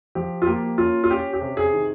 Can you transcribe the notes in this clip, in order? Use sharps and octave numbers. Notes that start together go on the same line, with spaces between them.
F3 G4
F4
A#3 G4
C#4 F4
F4
C#4 G4
G4
C3
G#4
D#3